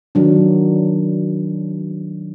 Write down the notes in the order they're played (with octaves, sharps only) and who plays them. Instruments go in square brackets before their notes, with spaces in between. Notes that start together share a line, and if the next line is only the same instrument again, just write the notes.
[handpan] D#3 F#3 D4